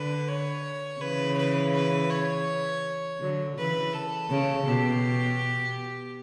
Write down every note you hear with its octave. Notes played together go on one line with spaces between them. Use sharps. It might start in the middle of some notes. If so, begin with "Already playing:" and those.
Already playing: D3 B4
C#5
C#3 E3 B4
B4
B4
C#5
D3 F#3
C#3 E3 B4
A4
C#3
B2 G4